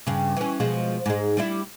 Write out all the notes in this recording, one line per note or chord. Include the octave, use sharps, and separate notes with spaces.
G2 C#3
E3 C#4
B2 F3 G#3
G#2 G#3
G3 D4 E4